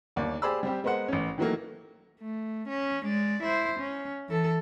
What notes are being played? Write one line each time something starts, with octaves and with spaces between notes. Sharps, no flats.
G1 D#2 D5
G4 G#4 C5 D5 B5 E6
G3 C4 G4
G#3 B3 A#4 C5 F#5
A1 C#4
D#3 E3 F#3 A3 A#3
A3
C#4
G#3 D5
E4 C5
C#4
E3 A4